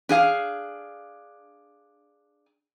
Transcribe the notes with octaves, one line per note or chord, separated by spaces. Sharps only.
D4 G#4 F5